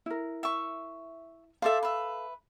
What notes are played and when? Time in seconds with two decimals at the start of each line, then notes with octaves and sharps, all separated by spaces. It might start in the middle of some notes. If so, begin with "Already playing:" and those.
0.06 E4 A#4
0.43 E5 C#6
1.62 A4 C5 D5 E5 F5
1.83 B4 E5